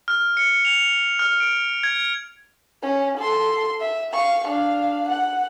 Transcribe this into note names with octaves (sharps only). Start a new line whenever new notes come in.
F6
C#7
F7
F6
D7
G#6
C#4
A4 C6
E5
F5 C#6
D4 F5
F#5